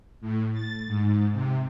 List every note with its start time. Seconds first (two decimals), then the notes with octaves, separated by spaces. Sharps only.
0.21 A2
0.53 A6
0.86 G#2
1.32 C3